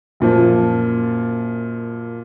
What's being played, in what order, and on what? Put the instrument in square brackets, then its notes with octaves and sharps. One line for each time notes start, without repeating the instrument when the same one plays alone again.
[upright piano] F#2 A#2 F3